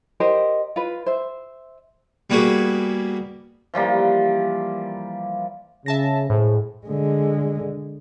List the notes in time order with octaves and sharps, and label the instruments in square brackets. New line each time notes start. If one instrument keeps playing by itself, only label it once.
[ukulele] G4 A#4 C5 D#5
F4 B4
C5 E5
[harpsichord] G3 A#3 B3 F#4 G#4
[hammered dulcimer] E3 F3 G3 A#3
[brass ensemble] C#3 [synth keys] E5 A5 A#6
[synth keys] A2 [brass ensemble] G#3 G#4 C5
[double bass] D3 G#3